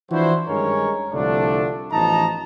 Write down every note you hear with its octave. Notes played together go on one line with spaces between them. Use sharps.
E3 F3 D4 E4 F#4 C5
G2 D#3 G#3 C#4 A#4 C#5
C2 D3 F3 A3 D4
A1 F3 B3 D#4 A5 A#5